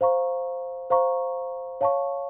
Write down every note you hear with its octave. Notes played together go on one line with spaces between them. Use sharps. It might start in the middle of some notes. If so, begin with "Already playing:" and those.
C5 F5 A#5 C#6
C5 F5 A#5 C#6
C#5 F5 A5 C#6